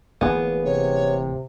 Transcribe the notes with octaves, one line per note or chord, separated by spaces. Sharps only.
D1 E3 A#3 B3 G#4
C3 C#5